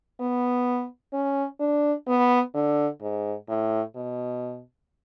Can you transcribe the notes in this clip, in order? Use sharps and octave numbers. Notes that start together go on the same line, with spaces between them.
B3
C#4
D4
B3
D3
G#2
A2
B2